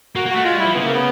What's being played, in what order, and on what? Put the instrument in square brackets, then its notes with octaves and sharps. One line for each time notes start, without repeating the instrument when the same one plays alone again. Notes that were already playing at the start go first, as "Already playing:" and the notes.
[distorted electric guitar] A#3 [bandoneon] F#4
[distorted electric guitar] A#3
[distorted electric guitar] A3 [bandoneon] F#4
[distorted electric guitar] G#3 [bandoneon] F4
[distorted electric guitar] G3 [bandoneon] E4
[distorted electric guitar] F3
[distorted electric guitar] C#3 [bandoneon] B3
[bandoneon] A#3
B3